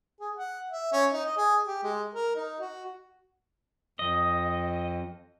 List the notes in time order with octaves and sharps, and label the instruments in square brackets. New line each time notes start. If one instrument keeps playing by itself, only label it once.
[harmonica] G#4
F#5
E5
C#4
D#4
D#5
G#4
G4
G#3
A#4
D#4
F#4
[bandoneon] F2 [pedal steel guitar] D#5